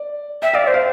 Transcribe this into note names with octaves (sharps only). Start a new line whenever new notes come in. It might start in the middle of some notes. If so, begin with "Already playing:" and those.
Already playing: D5
E5 G5
D5 F5
C5 E5
F5